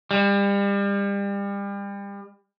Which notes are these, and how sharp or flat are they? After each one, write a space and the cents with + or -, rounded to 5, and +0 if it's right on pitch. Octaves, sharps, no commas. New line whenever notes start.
G3 +35